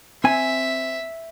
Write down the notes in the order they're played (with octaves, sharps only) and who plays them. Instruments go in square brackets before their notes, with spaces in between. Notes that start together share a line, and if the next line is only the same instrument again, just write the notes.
[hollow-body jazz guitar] C4 G#5 [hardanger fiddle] E5